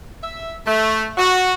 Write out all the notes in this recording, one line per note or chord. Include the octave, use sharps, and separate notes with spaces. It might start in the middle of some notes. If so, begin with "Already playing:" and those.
E5
A3
F#4